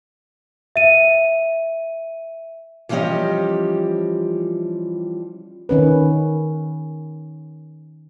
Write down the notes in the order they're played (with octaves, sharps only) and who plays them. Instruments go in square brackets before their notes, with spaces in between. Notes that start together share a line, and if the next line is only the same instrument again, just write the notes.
[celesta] E5 D#7
[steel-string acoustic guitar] E3 F3 G3 C#4 G4 D#5
[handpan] D#3 C#4 B4